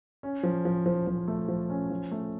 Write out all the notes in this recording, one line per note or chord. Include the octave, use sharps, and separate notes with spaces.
C#4
F3
F3
F3
F3
A3
F3
C#4
F3
A3